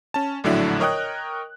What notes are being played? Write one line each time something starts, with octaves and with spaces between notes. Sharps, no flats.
C#4 A5
A#1 A2 D3 F#3 D4 E4
A#4 C#5 D#5 G5 D#6 F#6